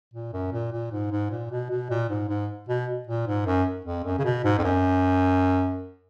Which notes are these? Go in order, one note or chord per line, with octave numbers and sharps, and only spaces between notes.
A#2
F#2
A#2
A#2
G#2
G#2
A#2
B2
B2
A#2
G#2
G#2
B2
A#2
G#2
F#2
F2
F#2
C#3
B2
G#2
F2
F#2